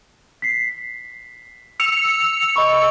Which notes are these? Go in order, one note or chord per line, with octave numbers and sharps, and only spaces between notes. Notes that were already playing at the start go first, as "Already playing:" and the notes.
B6 C7
E6 C#7 F7
D#5 B5 C#6